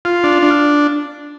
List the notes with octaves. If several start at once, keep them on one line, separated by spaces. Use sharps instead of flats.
F4
D4
D4